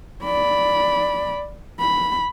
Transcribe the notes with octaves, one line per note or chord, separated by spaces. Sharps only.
D5 B5
B5